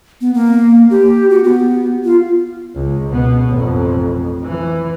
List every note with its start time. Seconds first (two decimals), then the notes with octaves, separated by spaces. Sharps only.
0.21 B3
0.34 A#3
0.90 G4
1.30 F#4
1.44 B3
2.04 F4
2.75 C#2
3.09 B2 B3
3.50 A1 F2
4.44 E3